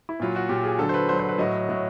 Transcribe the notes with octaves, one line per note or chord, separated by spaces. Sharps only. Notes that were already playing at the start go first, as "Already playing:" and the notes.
E4
A#2 F#3 F4
F#4
A#2 F#3 G4
G#4
D3 F#3 A4
C5
B4
D3 F#3 C5
C5
B4
A2 F#3 D#5
A2 F#3